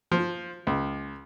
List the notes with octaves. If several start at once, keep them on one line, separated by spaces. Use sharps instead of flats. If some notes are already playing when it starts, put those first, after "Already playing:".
F3
C#2